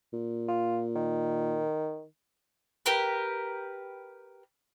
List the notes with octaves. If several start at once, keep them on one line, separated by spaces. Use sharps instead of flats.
A#2
F4
D#3
G4 A#4 B4